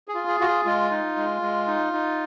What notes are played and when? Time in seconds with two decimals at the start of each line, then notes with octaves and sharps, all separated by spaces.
0.08 G#4
0.15 F4
0.27 G#4
0.40 F4 F#4
0.47 G#4
0.65 G#3 F4
0.91 D#4
1.17 G#3
1.42 G#3
1.67 D#4
1.93 D#4